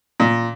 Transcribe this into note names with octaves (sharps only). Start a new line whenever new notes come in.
A#2